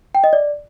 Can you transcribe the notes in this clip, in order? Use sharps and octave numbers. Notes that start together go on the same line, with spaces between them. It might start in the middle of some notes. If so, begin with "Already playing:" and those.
G5
D#5
D5